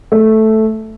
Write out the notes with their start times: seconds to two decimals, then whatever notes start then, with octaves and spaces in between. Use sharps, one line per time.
0.12 A3